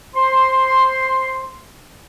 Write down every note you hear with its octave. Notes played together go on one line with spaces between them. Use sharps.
C5 C6